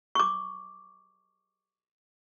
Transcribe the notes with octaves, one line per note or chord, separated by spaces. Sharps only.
C#6 D6